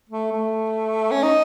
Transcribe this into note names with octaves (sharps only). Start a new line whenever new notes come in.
A3
A3
C#4
D#4